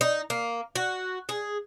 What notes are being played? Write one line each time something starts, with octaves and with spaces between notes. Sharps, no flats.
D#4
A#3
F#4
G#4